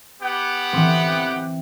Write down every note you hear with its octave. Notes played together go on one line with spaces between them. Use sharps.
B3 G4 F#5
E3 C4